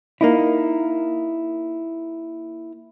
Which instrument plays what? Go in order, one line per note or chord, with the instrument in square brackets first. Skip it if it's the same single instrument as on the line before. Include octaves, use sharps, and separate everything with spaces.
[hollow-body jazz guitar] A#3 D#4 E4